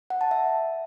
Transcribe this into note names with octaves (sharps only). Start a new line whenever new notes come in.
F#5
A5
E5